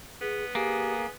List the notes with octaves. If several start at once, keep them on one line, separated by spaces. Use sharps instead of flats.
B3 G#4
A#3 G4 G#4